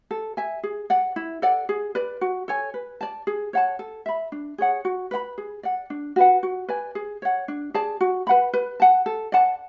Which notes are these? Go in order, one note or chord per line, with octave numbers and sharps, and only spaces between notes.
A4
E5 G#5
G#4
D5 F#5
E4
A4 D5 F#5
G#4
B4 D5
F#4
A4 C#5 G#5
B4
D5 A5
G#4
C#5 F#5 A5
A4
E5 B5
D4
G#4 C#5 F#5
F#4
B4 F#5 B5
G#4
D5 F#5
D4
F#4 B4 F#5
F#4
B4 D5 G#5
G#4
C#5 F#5
D4
G#4 D5 A5
F#4
B4 F#5 B5
B4
F#5 A5
A4
D5 F#5 A5